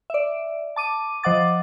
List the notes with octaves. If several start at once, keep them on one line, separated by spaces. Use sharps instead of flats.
D5 E5
A5 D6 D#7
F3 C5 D#5 F#5 D6 A6